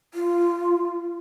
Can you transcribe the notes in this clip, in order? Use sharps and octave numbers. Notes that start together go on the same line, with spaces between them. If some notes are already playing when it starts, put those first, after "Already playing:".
F4